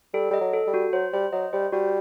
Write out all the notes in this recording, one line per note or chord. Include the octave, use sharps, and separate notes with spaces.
G3 A4
G3 D#5
F#3
A4
G3
F#4
F#3 C5
G3 C5
F#3 D#5
G3 C5
G3 F#4